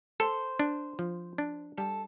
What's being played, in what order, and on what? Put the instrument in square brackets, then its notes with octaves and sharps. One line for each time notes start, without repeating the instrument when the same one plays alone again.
[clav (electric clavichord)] A4 [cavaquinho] C5
[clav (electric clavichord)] D4
F3
D4
[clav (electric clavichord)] G3 [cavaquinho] A4